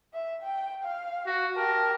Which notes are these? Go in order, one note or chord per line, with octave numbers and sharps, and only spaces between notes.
E5
G5
F5
F#4
G4 A#4 A5